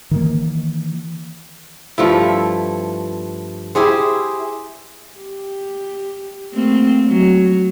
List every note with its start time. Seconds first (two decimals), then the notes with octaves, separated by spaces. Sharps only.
0.11 D#3 E3 A#3
1.98 G2 F3 A3 E4
3.75 E4 G4 G#4 C5
5.17 G4
6.54 A3 A#3 C4
7.07 F#3